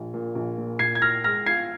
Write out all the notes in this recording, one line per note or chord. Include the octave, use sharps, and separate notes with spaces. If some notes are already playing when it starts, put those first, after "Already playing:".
Already playing: A#1
A#2
A#1
A#2
A#2 G#6 C7
G#6
A#2 F6 A#6
G#3 F6 A#6
F4 G#6 C7